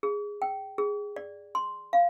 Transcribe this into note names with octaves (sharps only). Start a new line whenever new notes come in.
G#4
G5
G#4
D5
C6
F5